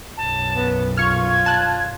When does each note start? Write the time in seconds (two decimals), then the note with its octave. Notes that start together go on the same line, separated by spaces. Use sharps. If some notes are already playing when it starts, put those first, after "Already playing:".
0.17 B1 F#2 A5
0.56 B3
0.97 F4 C#6 F6 G#6
1.46 A5 F#6